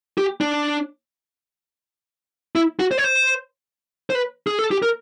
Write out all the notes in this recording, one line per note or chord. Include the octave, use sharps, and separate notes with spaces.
G4
D4
E4
F#4
C5
C#5
C5
C5
B4
G#4
A4
G4
A#4